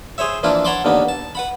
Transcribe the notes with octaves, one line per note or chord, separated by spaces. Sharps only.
G#4 C5 C#5 E5
E3 F3 A#3 D4 E4 F4
C#5 F#5 A5 B5 C6 D6
D#2 D3 A#3 B3
A5
B4 F#5 B5